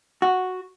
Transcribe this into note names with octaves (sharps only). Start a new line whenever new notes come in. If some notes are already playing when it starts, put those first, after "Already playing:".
F#4